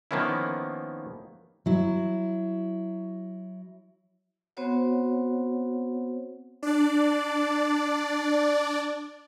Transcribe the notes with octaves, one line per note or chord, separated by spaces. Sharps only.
D#3 F3 A#3 B3 C#4 E4
F#3 E4
B3 C4 F#4 C5 C#5 F#5
D4 D5